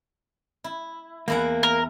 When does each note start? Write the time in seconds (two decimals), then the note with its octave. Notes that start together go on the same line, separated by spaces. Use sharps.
0.64 E4
1.28 E2 A#3 E4 F#5
1.63 A#4